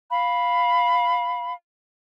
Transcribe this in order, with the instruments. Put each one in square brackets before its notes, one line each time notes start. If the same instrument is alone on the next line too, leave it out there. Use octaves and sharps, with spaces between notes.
[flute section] F5 B5